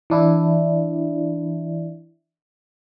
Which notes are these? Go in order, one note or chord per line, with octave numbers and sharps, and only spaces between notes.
E3 D4 E4